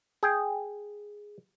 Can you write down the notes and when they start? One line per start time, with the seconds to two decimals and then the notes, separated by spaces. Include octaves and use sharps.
0.23 G#4 G5